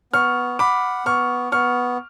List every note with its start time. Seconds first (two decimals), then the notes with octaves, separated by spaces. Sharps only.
0.13 B3 C#6 F6
0.59 F#5 B5 D6
1.06 B3 C#6 F6
1.52 B3 C#6 F6